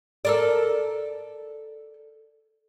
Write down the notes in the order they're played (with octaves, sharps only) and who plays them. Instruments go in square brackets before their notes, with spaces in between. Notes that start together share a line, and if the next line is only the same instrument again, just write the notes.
[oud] A4 A#4 D5